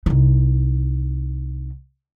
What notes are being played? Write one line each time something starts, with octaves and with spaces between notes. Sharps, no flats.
C2 D#4